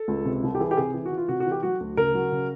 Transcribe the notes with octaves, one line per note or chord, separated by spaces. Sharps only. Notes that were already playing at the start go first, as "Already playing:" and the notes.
Already playing: A4
C#2
C3
C2
G4
E3 G#4
G4
C3 G#4
E3
F#4
E3
F4
C3 F#4
F#4
E3
G4
F#3 F#4
D2
C#3 A#4
F#3
C#3